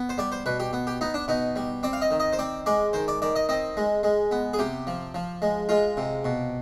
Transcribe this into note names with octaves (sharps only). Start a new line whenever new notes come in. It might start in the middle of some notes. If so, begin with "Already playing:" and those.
Already playing: B3
C5
G3 D5
C5
B2 B4
G4
B3
G4
B3 D#4
D4
B2 D#4
G3
C4 D5
F5
D#5
D#3
D#5
C5
C4 D5
G#3 D5
D#3 C5
D5
D#3 D5
D#5
C4 D#5
G#3
G#3
B3
G#4
C3 G4
F3
F3
G#3
G#3 F4
C3
B2